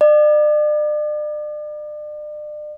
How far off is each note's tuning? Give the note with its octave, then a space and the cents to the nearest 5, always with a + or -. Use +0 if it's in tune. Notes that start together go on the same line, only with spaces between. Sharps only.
D5 +40